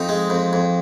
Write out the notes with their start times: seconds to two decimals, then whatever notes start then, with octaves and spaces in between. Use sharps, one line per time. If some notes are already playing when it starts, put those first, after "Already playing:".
Already playing: F2 C4 D#4
0.09 G#3
0.30 F2
0.53 F2